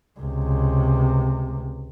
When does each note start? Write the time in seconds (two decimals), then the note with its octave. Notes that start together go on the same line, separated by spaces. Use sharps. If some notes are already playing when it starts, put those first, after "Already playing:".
0.20 C#2 C3